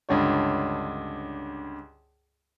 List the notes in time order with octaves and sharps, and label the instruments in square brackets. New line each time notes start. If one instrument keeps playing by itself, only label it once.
[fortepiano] C#2 G2 D3 C#5